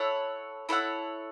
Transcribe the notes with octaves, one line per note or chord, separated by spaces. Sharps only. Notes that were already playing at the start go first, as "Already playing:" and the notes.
Already playing: E4 A4 C#5 F#5
E4 A4 C#5 F#5